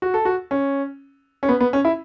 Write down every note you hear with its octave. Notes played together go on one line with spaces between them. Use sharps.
F#4
A4
F#4
C#4
C#4
B3
B3
C#4
E4